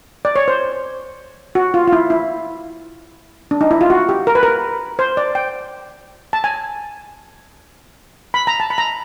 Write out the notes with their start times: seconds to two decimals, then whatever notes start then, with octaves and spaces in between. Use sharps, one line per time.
0.25 D5
0.36 C#5
0.48 C5
1.55 F#4
1.74 F4
1.87 F4
1.93 E4
2.10 E4
3.51 D4
3.61 D#4
3.71 E4
3.81 F4
3.90 F#4
4.09 G4
4.27 A#4
4.35 B4
4.43 A#4
4.99 C5
5.17 D5
5.35 G5
6.33 A5
6.44 G#5
8.34 B5
8.47 A#5
8.60 A5
8.70 B5
8.78 A#5